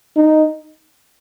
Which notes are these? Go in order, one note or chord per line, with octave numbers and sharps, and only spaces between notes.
D#4